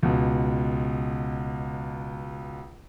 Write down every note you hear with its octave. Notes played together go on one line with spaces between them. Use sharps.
C#2 B2